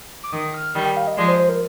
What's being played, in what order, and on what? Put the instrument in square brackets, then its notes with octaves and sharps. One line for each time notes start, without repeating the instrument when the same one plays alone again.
[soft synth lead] D6
[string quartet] D#3 [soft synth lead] D#6
[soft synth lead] F6
[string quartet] D#3 G3 [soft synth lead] D#6
[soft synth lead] G5
F5
D#5
[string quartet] F3 G#3 [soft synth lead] D5
[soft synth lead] C5
C5
A#4